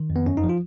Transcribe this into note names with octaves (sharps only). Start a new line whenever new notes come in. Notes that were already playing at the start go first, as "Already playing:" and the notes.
Already playing: D#3
F2
B3
F#2 C#4
D#4
F3
F4